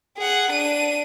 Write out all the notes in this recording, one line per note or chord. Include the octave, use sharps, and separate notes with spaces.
G#4 F#5
D4 D#7